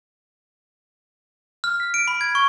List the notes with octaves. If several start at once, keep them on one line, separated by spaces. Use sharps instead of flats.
F6
B6
D7
B5
G#6
C#6